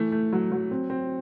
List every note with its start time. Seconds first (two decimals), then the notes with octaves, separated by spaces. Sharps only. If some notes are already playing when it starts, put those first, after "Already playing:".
Already playing: E3 A3
0.12 A3
0.33 F#3
0.52 F#3
0.71 C4
0.90 C4